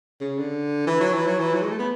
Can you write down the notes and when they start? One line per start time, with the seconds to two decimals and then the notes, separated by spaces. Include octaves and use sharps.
0.21 C#3
0.38 D3
0.87 E3
1.00 F#3
1.13 E3
1.26 F#3
1.39 E3
1.54 F#3
1.62 G#3
1.71 A3
1.79 B3